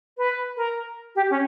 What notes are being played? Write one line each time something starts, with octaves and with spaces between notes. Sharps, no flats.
B4
A#4
G4
C#4